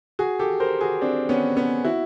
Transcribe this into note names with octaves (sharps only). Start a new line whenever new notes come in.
F#4 G#4
G4 A4
A#4 C5
F#4 G#4
C4 D4
B3 C#4
B3 C#4
E4 F#4